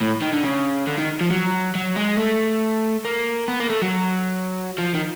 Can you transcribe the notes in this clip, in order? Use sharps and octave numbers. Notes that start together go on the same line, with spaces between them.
A2
D#3
D3
C#3
D3
D#3
F3
F#3
F#3
G#3
A3
A#3
B3
A#3
A3
F#3
F3
D#3